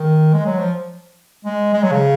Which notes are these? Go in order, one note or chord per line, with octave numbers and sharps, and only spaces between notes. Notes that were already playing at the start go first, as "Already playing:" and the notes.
Already playing: D#3
G#3
F#3
F3
G#3
G#3
F#3
C#3